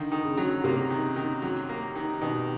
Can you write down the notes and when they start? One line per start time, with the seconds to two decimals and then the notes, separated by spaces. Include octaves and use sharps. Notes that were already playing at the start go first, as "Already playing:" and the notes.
Already playing: D3 D#3
0.12 D#3
0.25 C#3
0.38 F#3
0.64 C3 A#3
0.90 D#3
1.16 D#3
1.42 F#3
1.69 A#3
1.95 D#3
2.22 B2 D#3